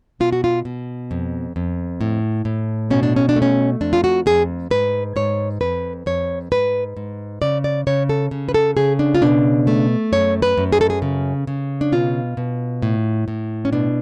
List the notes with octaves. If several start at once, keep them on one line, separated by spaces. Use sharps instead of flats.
B2 F4
F#4
F4
B2
F2
F2
A2
A2
B2 C#4
D4
C#4
D4
A3
C#4
F2 D4
F4
F#4
F2 G#4
G#2 B4
G#2 C#5
F2 B4
F2 C#5
G#2 B4
G#2
C#3 D5
D5
C#3 C#5
A4
C#3
B4
A4
C#3 G#4
D4
F4
B2 D4
A3
F#2 C#5
B4
F#2
G#4
A4
G#4
C#3
C#3
D4
B2 F4
B2
A2
A2
C#4
B2 D4